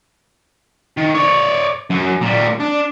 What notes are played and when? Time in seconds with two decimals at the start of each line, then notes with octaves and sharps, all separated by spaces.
0.97 D#3
1.15 C#5 D5
1.90 F#2
2.21 A#2 G3
2.60 D4